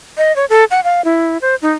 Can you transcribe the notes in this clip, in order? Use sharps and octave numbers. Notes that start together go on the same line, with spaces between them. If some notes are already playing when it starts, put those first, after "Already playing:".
D#5
C#5
A4
F#5
F5
E4
C5
D#4